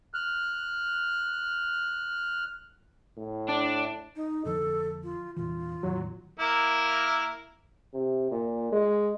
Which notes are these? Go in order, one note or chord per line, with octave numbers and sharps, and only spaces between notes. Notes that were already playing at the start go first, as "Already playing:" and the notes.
F6 F#6
A2
D4
D#4
F2 D3 F3 A4
F4
E2 A#2 E3 F4
E2 A2 D#3 F#3
A#3 E4 A#4
C3
A#2
G#3